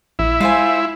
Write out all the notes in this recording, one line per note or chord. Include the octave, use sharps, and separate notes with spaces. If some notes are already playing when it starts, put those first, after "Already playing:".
A#1 E4
G#3 F4 C5 G#5